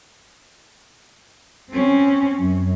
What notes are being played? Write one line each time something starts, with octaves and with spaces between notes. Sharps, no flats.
C4 C#4
F#2